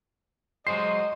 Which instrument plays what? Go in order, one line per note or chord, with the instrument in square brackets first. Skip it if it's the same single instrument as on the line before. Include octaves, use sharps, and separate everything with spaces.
[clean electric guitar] F#3 G#3 C5 [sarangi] D#5 [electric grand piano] C7